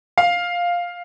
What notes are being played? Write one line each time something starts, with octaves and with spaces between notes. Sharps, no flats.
F5